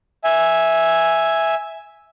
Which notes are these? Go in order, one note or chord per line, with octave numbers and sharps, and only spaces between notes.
E5 G#5